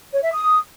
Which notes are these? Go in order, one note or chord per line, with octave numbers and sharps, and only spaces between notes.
C#5
E5
D#6